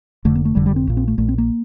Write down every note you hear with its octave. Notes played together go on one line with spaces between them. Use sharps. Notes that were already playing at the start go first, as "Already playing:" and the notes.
F1 F2 D3 A3
A#3
A3
F1 F2 D3 G3
G3
C4
A#1 A#2
C4
A3
A#1 A#2 A3
C4
A#3